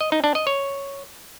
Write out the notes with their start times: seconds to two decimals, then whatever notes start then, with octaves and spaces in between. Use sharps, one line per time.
0.01 D#5
0.12 D#4
0.24 D4
0.35 D#5
0.47 C#5